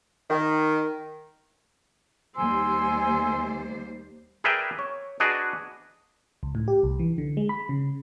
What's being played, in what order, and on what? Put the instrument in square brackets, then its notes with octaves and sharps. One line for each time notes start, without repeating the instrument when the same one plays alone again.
[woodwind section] D#3
[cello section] D#2 G3 C5 [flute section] G#5 C6 E6
[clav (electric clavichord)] G#4 A#4 B4 D5 E5 G5
C#5
D4 F#4 G#4 B4 D#5
[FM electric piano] C#2
A2
G4
C2
E3
D3
G#3
B5
C#3